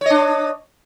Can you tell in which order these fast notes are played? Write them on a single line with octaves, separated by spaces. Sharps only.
C#5 D#5 D4